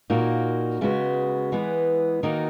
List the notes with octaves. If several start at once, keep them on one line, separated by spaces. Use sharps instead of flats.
A#2 A#3 D#4 F#4
C#3 G#3 B3 F#4
E3 G#3 B3
D#3 A#3 D#4 F#4 A#4